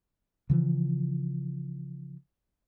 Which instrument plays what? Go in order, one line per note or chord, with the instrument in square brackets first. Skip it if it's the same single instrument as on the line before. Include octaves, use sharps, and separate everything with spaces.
[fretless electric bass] C#3 E3 F3